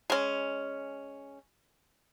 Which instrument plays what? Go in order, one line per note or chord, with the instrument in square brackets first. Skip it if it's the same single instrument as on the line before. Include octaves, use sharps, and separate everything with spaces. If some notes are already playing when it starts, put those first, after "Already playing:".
[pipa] G#3 C#4